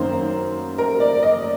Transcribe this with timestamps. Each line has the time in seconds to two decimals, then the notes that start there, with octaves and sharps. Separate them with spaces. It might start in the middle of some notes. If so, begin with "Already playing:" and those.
Already playing: F#2 D#3 F#3 A#3 C5
0.78 A#4
1.00 D5
1.23 D#5